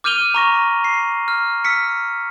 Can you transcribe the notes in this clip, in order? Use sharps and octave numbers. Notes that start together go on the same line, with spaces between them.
D6 F6 G6 D#7 F7 G7
A#5 C#6 A#6
C7
F6
E6 F6 B6 C#7